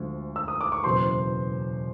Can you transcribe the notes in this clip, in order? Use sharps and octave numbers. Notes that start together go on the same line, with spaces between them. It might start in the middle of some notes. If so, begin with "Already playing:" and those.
Already playing: D2 D3 F3 G#3
E6
D#6
D6
C#6
F#1 E2 B2 C5 C6